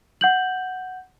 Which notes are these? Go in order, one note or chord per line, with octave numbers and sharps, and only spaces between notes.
F#5 G6 F#7